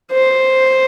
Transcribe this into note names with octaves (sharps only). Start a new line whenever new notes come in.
C5